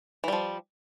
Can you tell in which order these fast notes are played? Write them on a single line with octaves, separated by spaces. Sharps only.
E3 G3 F3